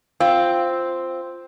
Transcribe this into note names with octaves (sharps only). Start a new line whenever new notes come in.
C4 F4